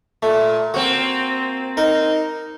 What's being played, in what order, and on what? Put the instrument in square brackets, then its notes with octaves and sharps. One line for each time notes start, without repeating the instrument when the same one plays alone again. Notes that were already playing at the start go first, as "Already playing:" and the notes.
[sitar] A#2 [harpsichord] A3
[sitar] A#3 C4 [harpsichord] F#4
[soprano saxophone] D#4 [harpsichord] A#4